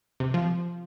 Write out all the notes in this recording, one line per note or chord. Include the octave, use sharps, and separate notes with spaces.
C3
F3